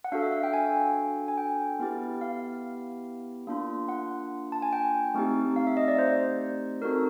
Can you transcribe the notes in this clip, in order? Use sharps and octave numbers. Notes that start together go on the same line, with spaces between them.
F#5
D4 F#4 A4 F5
E5
F5
G5
G#5
G#5
G5
B3 E4 G4
F5
A#3 D4 F4
F#5
A5
G#5
G5
A3 C4 D#4 G4
F5
E5
D#5
D5
C5
C4 D#4 F#4 A4 A#4
A4